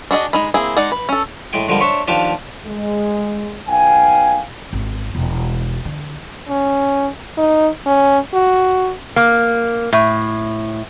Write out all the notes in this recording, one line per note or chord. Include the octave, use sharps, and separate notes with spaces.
D4 F#4 G#4 D#5
G#3 D#4 B5
A#3 C4 E4 G#4
G#3 D#4 D5 F#5
B4
C#4 A4
A2 G#3 G#4 G5
D3 F3 G3 G#3 A#3
D4 C5 C#5 E5 C#6
D#2 F3 D4 G4 F5 A5
G#3
B1 F5 G5 G#5
G#1
E1
D3
C#4
D#4
C#4
F#4
A#3
A2